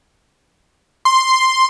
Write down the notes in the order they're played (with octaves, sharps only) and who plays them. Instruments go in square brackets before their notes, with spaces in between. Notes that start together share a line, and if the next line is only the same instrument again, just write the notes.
[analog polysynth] C6